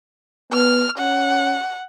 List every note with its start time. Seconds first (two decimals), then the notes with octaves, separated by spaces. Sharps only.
0.53 B3 F6
0.98 C#4 F#5